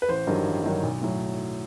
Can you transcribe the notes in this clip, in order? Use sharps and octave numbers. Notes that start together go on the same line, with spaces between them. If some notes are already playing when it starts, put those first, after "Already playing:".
B4
A1 C5
G2 D#3 F#3
A1
G2 D#3 F#3
B1
A2 F#3